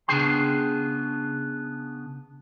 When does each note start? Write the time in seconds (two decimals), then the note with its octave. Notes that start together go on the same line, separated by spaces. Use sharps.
0.08 C#3 B3 D4 G#4 G5 C6